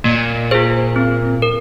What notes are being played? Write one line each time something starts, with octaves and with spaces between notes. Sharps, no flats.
A#2 A#3
F4 G#4 C5
C4
A#4